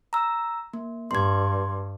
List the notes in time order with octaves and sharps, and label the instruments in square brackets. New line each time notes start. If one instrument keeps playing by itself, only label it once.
[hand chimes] A#5 E6
A#3
[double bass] G2 [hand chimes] C6 G#6